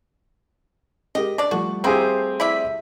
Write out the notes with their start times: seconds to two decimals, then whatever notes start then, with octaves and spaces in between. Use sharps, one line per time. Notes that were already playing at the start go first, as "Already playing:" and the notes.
1.15 G#3 G4 A#4 D#5
1.38 D4 D5 D6
1.51 F3 G3 A3 F#4
1.84 A#3 C4 E4 G4 G#4 C5
2.40 E4 D5 E5